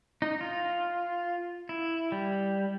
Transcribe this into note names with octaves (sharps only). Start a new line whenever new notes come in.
D#4
F4
E4
G3